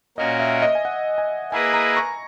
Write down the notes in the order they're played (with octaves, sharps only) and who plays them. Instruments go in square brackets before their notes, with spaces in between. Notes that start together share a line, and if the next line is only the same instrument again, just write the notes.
[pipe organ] A#2 A#3 C#4 F#4 A#4 [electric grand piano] D#5
[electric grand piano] E5
D#5
G#5
F#5
G#5
[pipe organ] A#3 E4 G#4 B4 D#5 [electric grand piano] G#5
[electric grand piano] A#5
C#6